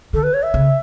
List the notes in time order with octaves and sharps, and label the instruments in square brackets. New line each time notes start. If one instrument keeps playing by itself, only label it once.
[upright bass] D3 [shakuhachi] A4
[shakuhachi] B4
C#5
E5
[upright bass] C#3